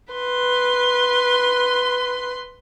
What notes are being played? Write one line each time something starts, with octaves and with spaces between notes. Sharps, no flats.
B4 C6